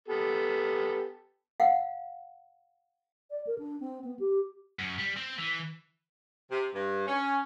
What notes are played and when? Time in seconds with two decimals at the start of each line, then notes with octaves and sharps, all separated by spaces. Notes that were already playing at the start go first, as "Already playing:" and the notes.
0.08 B3 G4 A4
1.60 F5 F#5
3.30 D5
3.47 A#4
3.58 D4
3.80 C4
4.04 B3
4.19 G4
4.79 F#2
4.98 G3
5.17 C4
5.38 E3
6.51 C3
6.74 G2
7.07 C#4